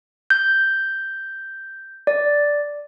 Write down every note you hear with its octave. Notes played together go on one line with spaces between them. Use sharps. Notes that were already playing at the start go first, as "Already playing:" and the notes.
G6
D5